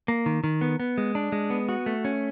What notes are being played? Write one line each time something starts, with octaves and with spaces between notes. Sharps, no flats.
A#3
D#3
D#3
B3
B3
G#3
D4
G#3
B3
F#4
A3
C#4